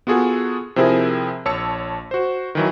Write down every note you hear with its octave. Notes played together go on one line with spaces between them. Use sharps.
B3 F4 F#4 G#4 A4
C3 F3 C4 E4 G#4 A#4
A#1 C#5 A5 E6 C#7
F#4 C5
D#3 E3 F#3